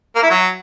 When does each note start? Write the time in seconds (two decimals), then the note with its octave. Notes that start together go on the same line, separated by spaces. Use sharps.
0.15 A#3
0.23 E4
0.30 F#3